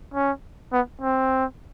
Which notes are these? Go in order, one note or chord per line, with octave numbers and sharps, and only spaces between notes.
C#4
B3
C4